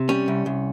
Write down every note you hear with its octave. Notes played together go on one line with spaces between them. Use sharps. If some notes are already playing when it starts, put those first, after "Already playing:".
Already playing: C3
G3 C#4
C2
C2